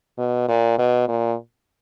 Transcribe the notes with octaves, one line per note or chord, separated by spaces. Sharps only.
B2
A#2
B2
A#2